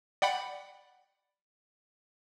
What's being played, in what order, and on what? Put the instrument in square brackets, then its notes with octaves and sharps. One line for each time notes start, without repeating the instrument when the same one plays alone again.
[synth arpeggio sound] D5 F#5 G5 B5